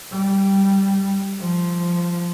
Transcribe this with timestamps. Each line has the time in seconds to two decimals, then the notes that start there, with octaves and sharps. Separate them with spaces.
0.13 G3
1.40 F3